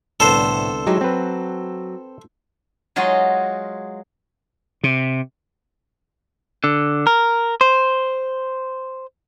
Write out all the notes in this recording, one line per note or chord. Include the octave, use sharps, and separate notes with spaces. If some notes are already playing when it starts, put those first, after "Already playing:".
C2 A2 D3 B3 A4 C5
F#3 G#3 D#4 E4 G4
F#3 C4 B4
F#3 G#3 F4 F#4 G#4 D#5
C3
D3
A#4
C5